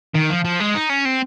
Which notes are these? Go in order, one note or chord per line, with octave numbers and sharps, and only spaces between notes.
D#3
F3
F3
G#3
D#4
C#4
C4